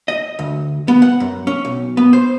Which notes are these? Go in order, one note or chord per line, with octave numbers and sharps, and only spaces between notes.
D#5
D2
B3
F#5
F#2
C#4
B1
B3
C5